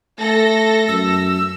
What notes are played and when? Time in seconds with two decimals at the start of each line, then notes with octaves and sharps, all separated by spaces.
0.20 A3 A4 A#6
0.88 F#2 E6